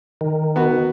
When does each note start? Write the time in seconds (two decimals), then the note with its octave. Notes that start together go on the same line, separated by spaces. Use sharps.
0.21 D#3
0.56 B3 F#4